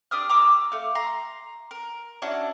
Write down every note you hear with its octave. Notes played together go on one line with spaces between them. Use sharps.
D4 G4 D#6 F6
A#5 D6 E6
A3 F5
A#5 C6
A#4
C#4 D4 E4 F#4